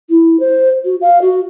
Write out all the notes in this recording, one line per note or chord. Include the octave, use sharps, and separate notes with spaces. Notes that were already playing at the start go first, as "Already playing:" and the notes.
E4
C5
F#4
F5
F#4